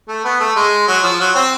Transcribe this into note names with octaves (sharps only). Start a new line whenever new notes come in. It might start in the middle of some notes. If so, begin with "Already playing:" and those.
A3
B3
A3
G#3
F#3
F3
F#3
C4